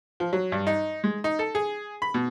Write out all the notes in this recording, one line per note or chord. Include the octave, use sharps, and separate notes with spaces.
F3
F#3
G2
D#4
G#3
D#4
A4
G#4
B5
B2